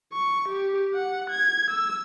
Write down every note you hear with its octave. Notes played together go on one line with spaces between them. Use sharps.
C#6
G4
F#5
G#6
E6